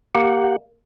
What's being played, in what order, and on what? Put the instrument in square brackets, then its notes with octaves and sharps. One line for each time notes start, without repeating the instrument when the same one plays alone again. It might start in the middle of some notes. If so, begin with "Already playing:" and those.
[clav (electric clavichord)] A#3 [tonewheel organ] G4 F#5